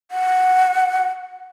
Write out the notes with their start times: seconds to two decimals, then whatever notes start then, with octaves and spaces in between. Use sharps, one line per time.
0.11 F#5